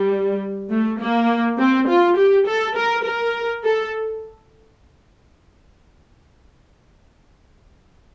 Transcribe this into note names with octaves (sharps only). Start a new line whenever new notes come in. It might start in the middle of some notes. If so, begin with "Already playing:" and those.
Already playing: G3
A3
A#3
C4
F4
G4
A4
A#4
A#4
A4